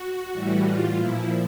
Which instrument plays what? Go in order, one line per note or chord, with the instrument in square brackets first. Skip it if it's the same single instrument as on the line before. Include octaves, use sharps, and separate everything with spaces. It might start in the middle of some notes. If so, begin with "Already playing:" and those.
Already playing: [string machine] F#4
A2 E3 G3
F4
A#2 F3 E4